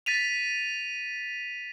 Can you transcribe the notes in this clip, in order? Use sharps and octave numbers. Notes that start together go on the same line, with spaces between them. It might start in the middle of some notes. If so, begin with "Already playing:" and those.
A6 B6 D#7 F7